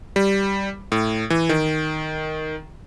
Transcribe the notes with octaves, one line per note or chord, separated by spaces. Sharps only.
G3
A2
E3
D#3